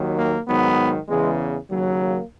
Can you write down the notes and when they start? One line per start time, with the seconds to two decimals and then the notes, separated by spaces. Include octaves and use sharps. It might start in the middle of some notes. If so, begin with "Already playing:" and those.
Already playing: D#2 D#3 F#3
0.19 A#3
0.48 G#2 D#3 F#3 B3
1.09 E2 C#3 E3 G#3
1.70 D#2 C#3 F#3
2.01 A#3